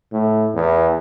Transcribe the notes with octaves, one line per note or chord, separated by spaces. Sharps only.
A2
E2